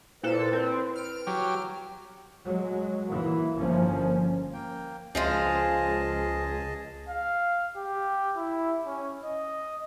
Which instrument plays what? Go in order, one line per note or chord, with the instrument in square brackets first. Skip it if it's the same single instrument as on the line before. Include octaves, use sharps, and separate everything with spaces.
[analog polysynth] A#2 A4 [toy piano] E4 C5 [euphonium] B4
[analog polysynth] C4
F6 D7
[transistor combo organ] F#3 G4
[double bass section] F#3 G#3
E3 A#3
G1 F3 A#3 C#4
[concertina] A#3 G5
[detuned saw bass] C#2 [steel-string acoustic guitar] F3 G#3 F4 [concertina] G#4 D#5 A5
[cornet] F5
G4
E4
C#4
D#5